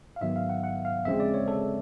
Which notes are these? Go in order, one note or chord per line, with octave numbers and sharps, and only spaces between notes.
F5
G#2 D#3 F#3 B3 E5
F5
F#5
F#5
F5
D#2 C#3 F3 G#3 C4 E5
D5
C#5
A4